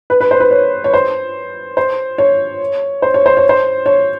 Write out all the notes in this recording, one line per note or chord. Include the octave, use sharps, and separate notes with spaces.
B4
B4
C5
B4
C#5
C#5
C5
C5
C#5
C5
C#5
C5
C#5
C5
C#5